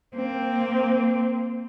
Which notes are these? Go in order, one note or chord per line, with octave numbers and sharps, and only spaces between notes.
A#3 C4